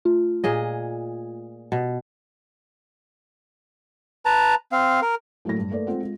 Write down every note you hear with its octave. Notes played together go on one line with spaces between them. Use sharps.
A3 F4
A#2 G#4 D#5
B2
B4 A5 A#5
C4 F5
A#4
A2 F#3 A3 A#3 E4 A#6
G2
A3 A#3 A4 B4 D5
G#3 C4 F4 A4 F#5
G#3 F4